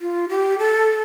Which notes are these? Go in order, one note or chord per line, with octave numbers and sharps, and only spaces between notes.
F4
G4
A4